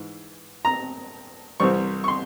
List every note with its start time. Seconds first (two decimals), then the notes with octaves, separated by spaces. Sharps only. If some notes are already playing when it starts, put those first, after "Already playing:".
Already playing: G#2 E3
0.65 A#5
1.60 C2 C3 E3 G3 C4 C#6
2.04 C#6
2.08 C6